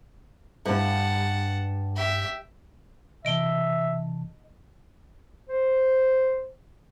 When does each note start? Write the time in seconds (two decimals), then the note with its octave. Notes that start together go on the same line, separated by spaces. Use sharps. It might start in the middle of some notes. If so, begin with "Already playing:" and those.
0.66 G2 F#5 A5
1.96 G4 E5
3.25 C3 E3 D#5 E5 A5 D7 G7
5.49 C5